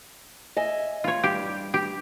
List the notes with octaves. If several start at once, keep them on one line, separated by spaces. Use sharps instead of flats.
D#5 E5 G#5
F4 C#5
G2 G4
G4